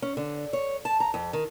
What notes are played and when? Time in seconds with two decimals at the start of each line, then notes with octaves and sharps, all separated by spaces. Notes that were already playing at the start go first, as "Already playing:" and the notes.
0.02 C#4
0.17 D3
0.53 C#5
0.85 A5
1.00 A#5
1.14 F2
1.33 D#3